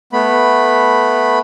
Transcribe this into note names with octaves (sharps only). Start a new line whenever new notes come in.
A3 B3 B5